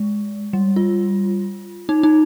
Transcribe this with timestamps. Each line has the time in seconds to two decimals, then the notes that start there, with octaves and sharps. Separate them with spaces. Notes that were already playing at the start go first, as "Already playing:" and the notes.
Already playing: G#3
0.53 G3
0.76 F4
1.89 D#4
2.03 D#4